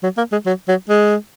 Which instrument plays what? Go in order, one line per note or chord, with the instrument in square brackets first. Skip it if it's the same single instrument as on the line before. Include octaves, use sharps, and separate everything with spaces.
[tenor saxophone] F#3
A#3
G#3
F#3
F#3
G#3